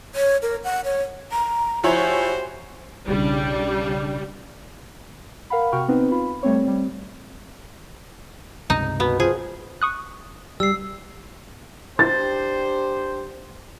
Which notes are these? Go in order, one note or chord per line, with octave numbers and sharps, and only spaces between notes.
C#5
A#4
F#5
C#5
A#5
F3 E4 F#4 G4 C5 C#5 G#5
B1 C#3 G3 D4 E4
A#4 F5 F#5 B5
C3 F#4 G5 C#6 F6
B3 C4 D#4 B4
F4 B5
G3 A3 C4 C#5
G3 C4
C#2 G2 C3 D#4
B2 B3
F3 G#4
C#6 D#6 F#6
G3 E6 C7
D4 G4 C5 A6